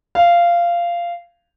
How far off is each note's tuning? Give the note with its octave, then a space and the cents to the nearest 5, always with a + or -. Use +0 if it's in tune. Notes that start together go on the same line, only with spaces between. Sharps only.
F5 -15